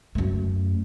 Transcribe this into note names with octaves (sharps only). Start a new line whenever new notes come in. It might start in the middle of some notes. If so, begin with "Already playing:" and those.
F#2 A3